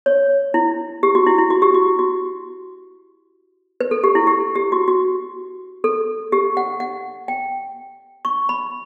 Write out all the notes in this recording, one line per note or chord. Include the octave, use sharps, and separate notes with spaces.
C#5
E4
G4
F#4
E4
E4
F#4
G4
F#4
F#4
B4
A4
G4
E4
G4
G4
F#4
F#4
A4
G4
F#5
F#5
G5
C#6
B5